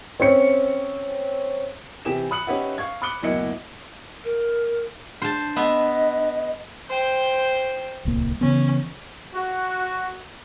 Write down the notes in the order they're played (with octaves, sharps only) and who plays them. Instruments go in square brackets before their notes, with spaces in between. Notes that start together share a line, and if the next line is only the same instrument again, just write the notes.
[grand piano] C4 C#4 C#7
[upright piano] C3 E3 G4 G#5 E7
B5 D#6 F#6 C#7 F#7
C#4 D#4 G4 B4 E5 F#5
F5 C#6 G#6
B5 D6 D#6 F#6 C#7 G7
F#1 D2 B2 E4 D#5 C#7
[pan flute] A#4
[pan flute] D4 [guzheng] C5 A5
[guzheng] B3 E5 [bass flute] D#5
[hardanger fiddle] C5 G5
[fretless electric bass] D1 C2 A#3
[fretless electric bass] C#3 E3 B3 [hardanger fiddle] C#4
[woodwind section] F#4